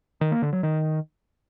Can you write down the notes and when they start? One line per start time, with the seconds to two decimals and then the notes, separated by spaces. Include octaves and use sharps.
0.21 D#3
0.32 A#3
0.42 D3
0.53 F#3
0.63 D#3